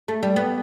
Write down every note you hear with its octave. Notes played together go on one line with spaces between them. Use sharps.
A3
G3
B3